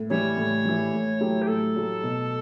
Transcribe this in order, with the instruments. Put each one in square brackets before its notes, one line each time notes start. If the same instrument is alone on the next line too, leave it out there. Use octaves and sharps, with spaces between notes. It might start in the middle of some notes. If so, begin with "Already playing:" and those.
Already playing: [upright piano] A2
[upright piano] E3 G3 [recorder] C#5
[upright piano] A2
E3 G3
A2
F#3 A3 E4 G4
[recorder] G4
[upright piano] A2 [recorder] A4
[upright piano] F#3 A3 E4 G4
B2